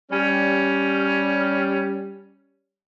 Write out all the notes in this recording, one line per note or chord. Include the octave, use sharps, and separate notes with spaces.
G3 C#4